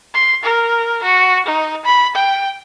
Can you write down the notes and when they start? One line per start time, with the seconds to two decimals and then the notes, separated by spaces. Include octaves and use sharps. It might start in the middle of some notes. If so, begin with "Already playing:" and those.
0.14 C6
0.43 A#4
1.03 F#4
1.46 D#4
1.85 B5
2.15 G5